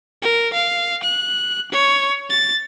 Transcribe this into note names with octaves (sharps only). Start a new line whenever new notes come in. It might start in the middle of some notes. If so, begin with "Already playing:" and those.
A#4
F5
F#6
C#5
A6